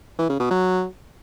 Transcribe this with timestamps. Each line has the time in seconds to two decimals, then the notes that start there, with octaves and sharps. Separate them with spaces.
0.18 E3
0.29 C#3
0.40 B2
0.51 F#3